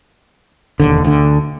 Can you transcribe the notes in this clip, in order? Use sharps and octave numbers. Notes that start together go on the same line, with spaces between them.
E1 D#2 D3
D2 D3